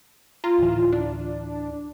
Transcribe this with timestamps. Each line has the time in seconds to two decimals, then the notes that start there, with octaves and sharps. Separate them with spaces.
0.44 F4 A#5
0.58 D2 A2 E3
0.92 D4